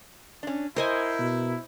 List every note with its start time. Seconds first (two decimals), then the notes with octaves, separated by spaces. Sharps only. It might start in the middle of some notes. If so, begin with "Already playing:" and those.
0.43 C#4 D4
0.76 E4 A#4 C5 D#5 G#5
1.19 B2